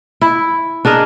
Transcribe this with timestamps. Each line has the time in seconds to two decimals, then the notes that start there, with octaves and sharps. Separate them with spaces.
0.21 E4
0.85 D4 G#4 A#4 D#5